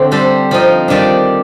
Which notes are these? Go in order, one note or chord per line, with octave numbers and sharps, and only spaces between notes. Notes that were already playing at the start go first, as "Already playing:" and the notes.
Already playing: D3 A3 C4
G3 D4 A4 C5
F3 C4 D#4
D#3 G3 D4 G4 D5